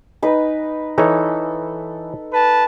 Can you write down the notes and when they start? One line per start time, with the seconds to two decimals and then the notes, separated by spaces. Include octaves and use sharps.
0.22 D#4 B4
0.98 E3 D#4 A4 C#5
2.31 B4 A5